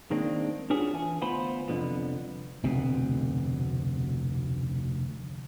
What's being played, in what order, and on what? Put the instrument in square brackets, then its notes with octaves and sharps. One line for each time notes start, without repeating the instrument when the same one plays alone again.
[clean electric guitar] D#3 G#3 A#3 C4 D4
D4 F4 F#4 G#4 B4 C#5
E3 G#5
D2 B3 F4 C5 B5
C2 F2 G#2 D3 F3 B3
[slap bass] F1 D2 B2 C4